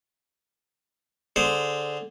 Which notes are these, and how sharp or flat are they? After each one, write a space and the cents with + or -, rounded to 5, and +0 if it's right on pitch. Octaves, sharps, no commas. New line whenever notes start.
D3 +0 G#4 +0 C5 -10